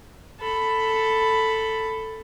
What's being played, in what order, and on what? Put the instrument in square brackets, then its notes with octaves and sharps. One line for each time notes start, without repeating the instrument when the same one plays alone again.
[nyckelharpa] A4 B5